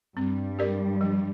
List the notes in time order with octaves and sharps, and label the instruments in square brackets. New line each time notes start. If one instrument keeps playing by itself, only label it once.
[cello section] G2 G3 [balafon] C4
[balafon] G4 A#4 D5
F3